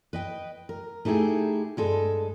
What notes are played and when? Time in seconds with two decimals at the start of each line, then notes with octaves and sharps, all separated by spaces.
0.13 B4 D#5 G5
0.69 A#4
1.05 A3 D#4 E4 G4 G#4
1.77 G2 G#3 A4